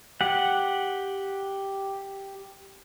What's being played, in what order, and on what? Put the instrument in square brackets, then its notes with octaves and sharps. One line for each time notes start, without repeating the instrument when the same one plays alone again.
[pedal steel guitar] G4 F#5